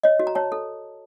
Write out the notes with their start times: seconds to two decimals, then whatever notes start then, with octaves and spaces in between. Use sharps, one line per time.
0.03 C#5 D#5
0.20 F#4
0.27 A#5
0.35 C#5 A5
0.52 A4